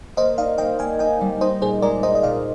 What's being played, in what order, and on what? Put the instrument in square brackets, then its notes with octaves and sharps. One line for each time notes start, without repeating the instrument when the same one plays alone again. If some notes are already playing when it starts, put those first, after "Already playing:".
[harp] A#3 [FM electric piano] C5 D#5
[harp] D#4 [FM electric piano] D5 F5
[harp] A#3 [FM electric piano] D#5 G5
[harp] A#3 [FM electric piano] F5 G#5
[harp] D#4 [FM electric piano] D#5 G5
[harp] G3
[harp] D#4 [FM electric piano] C5 D#5
[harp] A#2 [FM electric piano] G#4 C5
[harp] G#3 [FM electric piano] A#4 D5
[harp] D#4 [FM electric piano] C5 D#5
[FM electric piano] D#5
[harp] A#2 [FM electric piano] D5 F5